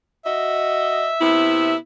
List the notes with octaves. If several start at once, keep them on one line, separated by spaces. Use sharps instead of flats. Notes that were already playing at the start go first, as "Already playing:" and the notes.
F#4 D#5 E5
C3 B3 E4